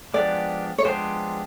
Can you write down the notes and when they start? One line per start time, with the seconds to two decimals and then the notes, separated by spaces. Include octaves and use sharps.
0.14 F3 G#3 B3 D4 G4 D5
0.78 C#5
0.85 F3 G#3 B3 D4 G4 C5